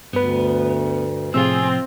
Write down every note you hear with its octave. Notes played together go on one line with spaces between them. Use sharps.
D2 G2 B3 B4
A2 C3 F3 C4 F4 G#4 E6